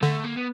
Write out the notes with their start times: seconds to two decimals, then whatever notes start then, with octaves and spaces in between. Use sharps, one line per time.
0.02 D3 A3
0.24 A#3
0.37 B3